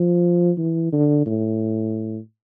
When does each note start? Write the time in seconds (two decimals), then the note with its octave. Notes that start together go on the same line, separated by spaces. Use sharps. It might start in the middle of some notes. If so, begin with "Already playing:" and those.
Already playing: F3
0.58 E3
0.93 D3
1.26 A2